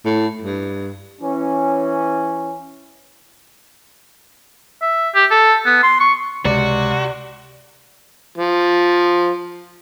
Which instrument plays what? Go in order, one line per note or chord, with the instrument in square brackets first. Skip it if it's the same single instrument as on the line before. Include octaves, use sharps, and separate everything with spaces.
[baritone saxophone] A2
G2
[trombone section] E3 C#4
[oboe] E5
G4
A4
B3
C6
C#6
[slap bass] C#2 [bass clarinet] C3 [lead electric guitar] F#4 [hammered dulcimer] D5
[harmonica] F3